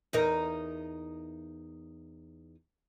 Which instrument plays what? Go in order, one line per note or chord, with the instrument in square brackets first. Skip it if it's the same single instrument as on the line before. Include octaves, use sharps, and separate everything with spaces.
[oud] E2 D#4 A#4